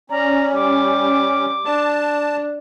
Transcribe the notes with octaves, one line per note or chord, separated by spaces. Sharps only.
C#4 D5 A#5
G3 D6
D4 A5